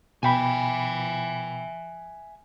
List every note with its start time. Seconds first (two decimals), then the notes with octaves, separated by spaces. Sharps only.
0.23 B2 E5 G5 G#5 B5